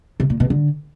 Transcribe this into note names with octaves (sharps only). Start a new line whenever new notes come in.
C3
A#2
B2
D3